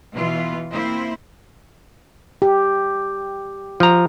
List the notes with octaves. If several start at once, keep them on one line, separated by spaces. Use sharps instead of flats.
B2 E3 F4
A#3 C4 E4 C5
G4
F3 A#5